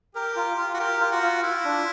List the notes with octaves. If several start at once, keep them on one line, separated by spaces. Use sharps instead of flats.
G4 A#4
F4
F4
F#4
G4 A#4
F4
F#4
F4
E4 F4
D4